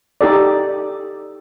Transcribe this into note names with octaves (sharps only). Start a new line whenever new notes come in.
D#4 G4 A4 D5